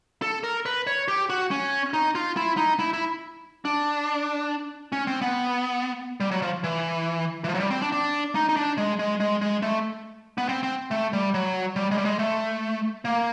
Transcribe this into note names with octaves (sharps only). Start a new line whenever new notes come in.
A4
A#4
B4
C#5
G4
F#4
C#4
D#4
F4
E4
D#4
E4
E4
D4
C#4
C4
B3
G3
F#3
F3
E3
E3
F3
F#3
G3
C4
D4
D4
D#4
D#4
D4
G#3
G#3
G#3
G#3
A3
B3
C4
C4
A3
G3
F#3
G3
G#3
G3
G#3
A3
A#3